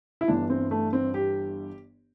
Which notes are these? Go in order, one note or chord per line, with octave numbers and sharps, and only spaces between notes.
E4
G1 G2 E3 D4
C4
A3
C4
G4